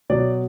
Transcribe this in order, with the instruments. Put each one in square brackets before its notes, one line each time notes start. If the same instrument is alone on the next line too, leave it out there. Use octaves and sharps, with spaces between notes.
[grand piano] B2 F#3 D5